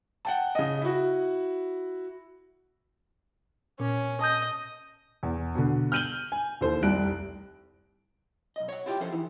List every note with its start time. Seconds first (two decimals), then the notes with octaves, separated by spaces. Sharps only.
0.25 F#5 G5 A5
0.55 C#3 D#5
0.81 E4 F#4
3.80 A#2 C#4
4.20 D#5 A5 D#6 G6
5.23 E2
5.55 B2 D3
5.92 F6 G6 D#7 F#7 G7
6.32 G#5
6.61 D#2 E3 A4 C5
6.83 F1 C2 G3 F#6 D7
8.56 B1 D#5
8.69 C#5 F#5
8.86 E4 F4 G4 F#5 G5
9.00 F3 C#4 A4 C5 F#5
9.12 E3 D#4 E4